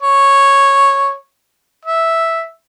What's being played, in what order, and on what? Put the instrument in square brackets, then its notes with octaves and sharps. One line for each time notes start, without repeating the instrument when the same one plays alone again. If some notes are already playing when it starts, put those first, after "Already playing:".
[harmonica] C#5
E5